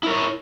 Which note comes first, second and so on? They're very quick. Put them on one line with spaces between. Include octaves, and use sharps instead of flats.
E4 A#4 C#5